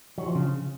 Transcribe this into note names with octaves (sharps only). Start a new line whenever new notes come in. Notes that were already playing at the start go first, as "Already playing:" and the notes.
F#3
F3
C#3